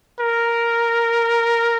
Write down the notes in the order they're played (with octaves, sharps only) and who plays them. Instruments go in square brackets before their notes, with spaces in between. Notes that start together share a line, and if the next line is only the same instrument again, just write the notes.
[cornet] A#4